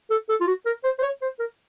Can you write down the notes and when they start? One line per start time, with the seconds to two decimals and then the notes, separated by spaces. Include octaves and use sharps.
0.10 A4
0.29 A4
0.41 F4
0.47 F#4
0.66 A#4
0.84 C5
0.99 C5
1.03 C#5
1.22 C5
1.40 A#4